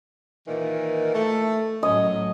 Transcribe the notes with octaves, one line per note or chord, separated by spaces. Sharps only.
A#2 D#3 E3
A3
A2 F#3 C#4 D#5